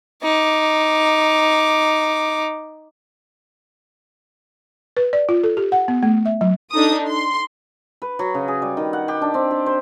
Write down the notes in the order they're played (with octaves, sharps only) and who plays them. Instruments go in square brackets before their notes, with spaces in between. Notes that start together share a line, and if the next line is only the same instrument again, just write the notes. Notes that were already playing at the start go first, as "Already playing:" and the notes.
[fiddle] D#4 D6
[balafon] B4
D5
F4
A4
G4
F#5
B3
A3
E5
F#3
[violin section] D4 D#4 A4 D#6
C6
[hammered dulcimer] B4
F#3
C#3
G#4
G3
D#3
F#5
G4
D4
C4
G4
C5